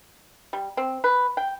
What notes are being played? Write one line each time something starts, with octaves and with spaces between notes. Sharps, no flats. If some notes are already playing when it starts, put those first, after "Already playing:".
G3
C4
B4
G5